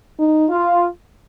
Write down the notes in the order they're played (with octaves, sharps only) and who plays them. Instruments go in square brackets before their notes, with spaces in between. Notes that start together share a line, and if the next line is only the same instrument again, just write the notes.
[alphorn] D#4
[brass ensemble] F4